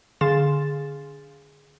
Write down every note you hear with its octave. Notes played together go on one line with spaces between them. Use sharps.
D3 G#4 F5 C6 A6 E7